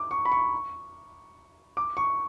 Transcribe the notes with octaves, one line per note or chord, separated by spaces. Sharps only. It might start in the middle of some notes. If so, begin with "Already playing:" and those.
Already playing: D6
C#6
B5
C#6
D6
C#6